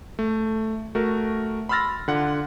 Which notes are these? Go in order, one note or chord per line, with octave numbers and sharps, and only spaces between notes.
A3
A3 F#4 A#4
B5 C6 E6 F6 A6 A#6
D3 F4 F#5